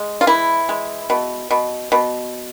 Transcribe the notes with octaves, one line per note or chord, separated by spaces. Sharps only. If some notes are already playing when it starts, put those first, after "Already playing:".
Already playing: G#3
F4
E3 E4
G#3
B2
B2
B2